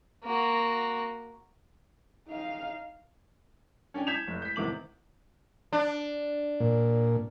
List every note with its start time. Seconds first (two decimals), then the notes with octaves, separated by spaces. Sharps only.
0.24 A#3 F#4
2.28 D#4 F5
3.94 C#4 D4 G5 G#5
4.07 G6 G#6 B6 E7 F7
4.27 F1
4.42 G6 B6
4.56 A1 E2 C3 D#3 D6 F#7
5.73 D4
6.60 A#2